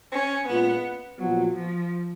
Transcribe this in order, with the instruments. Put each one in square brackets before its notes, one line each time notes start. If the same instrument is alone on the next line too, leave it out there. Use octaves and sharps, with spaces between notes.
[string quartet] C#4
[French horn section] A#2 G#3 C#4 F4 [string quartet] B3
[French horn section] A#2 F3 B3 F#4 [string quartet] F#3
[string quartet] F3